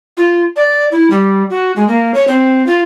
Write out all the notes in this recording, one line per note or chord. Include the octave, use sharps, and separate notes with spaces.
F4
D5
E4
G3
F#4
G#3
A#3
C#5
C4
F4